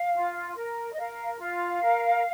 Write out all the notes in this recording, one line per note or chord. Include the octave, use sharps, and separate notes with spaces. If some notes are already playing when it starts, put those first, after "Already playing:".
Already playing: F5
F4
A#4
D#5
A#4 F5
F4 F5
A#4